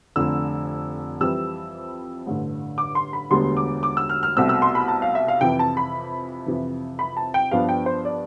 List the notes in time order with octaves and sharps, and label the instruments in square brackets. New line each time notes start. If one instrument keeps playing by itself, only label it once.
[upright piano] F1 F2 D3 E6
F2 E3 G3 C4 E6
A1 G2 D3
D6
C6
B5
E1 D2 D3 G3 B3 C6
D6
D6
E6
F6
F6
C2 B2 A3 C4 E6
E6
C6
B5
A5
F5
E5
F5
F2 C3 E3 G5
A5
B5
F2 C3 E3
B5
A5
G5
G2 F3 B3 D4 F5
G5
C5
D5